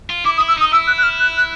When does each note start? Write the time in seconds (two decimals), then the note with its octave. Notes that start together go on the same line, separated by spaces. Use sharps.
0.10 F4
0.25 E4 D6
0.37 D#6
0.40 E4
0.48 E6
0.56 D#4 D#6
0.72 E4 E6
0.87 F#6
0.98 F#6
1.03 F6
1.20 F#6
1.37 F#6